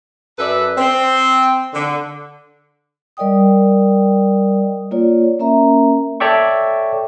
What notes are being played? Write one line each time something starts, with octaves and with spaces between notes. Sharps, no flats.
F#2 A4 B4 D5 E5
C4
D3
G3 A#4 D5 D#5 G5 D#6
A#3 F4 C#5 D5
A#3 C#4 A#4 E5 A#5
A4 C#5 D5 E5 G5 C#6